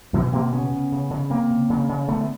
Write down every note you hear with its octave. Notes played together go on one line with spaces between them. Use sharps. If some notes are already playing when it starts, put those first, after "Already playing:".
B2 E3 F#3
B2 A#3 C4
C#3 B3 C#4
C#3
C#3
C#3
C#3 A#3 C4
C#3
C#3
C#3
D3 A3 B3
B3